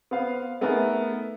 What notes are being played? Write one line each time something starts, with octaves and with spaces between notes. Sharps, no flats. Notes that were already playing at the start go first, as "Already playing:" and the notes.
B3 C5 F5
A3 B3 D#4 G#4 A#4